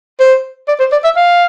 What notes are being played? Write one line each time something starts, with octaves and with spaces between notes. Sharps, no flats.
C5
D5
C5
D5
E5
F5